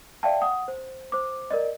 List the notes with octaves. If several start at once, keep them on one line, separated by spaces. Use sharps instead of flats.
D5 E5 F5 G5 A5
F#5 D#6
C5
C5 D6
A#4 D5 D#5